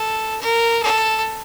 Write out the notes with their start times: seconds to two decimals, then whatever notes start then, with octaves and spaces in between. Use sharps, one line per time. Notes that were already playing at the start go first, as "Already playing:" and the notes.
Already playing: A4
0.41 A#4
0.82 A4